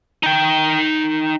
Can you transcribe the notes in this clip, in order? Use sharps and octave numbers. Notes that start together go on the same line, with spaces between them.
D#4 G5